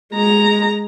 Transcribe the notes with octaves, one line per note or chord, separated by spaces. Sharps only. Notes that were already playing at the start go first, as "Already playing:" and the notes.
G#3 A#5